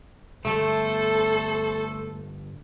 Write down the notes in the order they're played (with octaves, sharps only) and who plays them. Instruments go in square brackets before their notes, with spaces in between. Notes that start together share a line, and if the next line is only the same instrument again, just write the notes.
[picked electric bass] G2 D3 G3 [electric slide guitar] A3 [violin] A4 C5